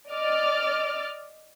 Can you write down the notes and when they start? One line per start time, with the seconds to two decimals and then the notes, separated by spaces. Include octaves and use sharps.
0.11 D5 D#5 D6 F6 A6